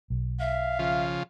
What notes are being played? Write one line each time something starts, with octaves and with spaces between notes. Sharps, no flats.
B1
E5 F5
C#3 F3 F4